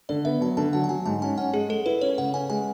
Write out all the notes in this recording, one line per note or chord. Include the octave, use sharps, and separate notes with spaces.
D3 D5
B3 E5
F#3 A5
D3 A5
F#3 F#5
A5
F#3 G#5
G#2 A5
C#4 G#5
C#4 F#5
G#3 G#4
G#3 A4
E4 B4
C#4 C#5
C#3 F#5
C#4 G#5
G#3 G#5